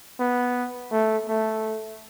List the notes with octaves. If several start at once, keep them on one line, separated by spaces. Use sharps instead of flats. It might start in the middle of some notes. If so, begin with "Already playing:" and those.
B3
A3
A3